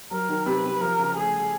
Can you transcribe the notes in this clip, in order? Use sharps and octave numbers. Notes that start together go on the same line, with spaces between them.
F#3 A#4
D#3
C3 B4
C3
F3 A#4
C#3
A3 G#4